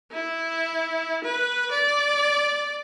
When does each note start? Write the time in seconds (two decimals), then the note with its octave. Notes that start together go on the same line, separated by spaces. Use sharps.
0.12 E4
1.24 B4
1.71 D5